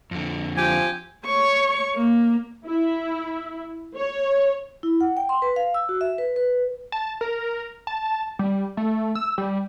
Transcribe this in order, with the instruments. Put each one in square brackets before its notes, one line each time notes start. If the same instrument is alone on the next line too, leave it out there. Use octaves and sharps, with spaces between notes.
[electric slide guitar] F2 D3
[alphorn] F3 [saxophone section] C4 G4 [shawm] G#5
[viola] C#5 C#6
A#3
[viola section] E4
C#5
[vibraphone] E4
F#5
G5
C6
B4
F5
E6
F#4
E5
B4
B4
[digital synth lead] A5
A#4
A5
G3
A3
E6
G3